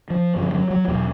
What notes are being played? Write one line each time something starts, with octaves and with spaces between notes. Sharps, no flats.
F3
G2 D3 F3
F3
F#3
F#3
E2 B2 F#3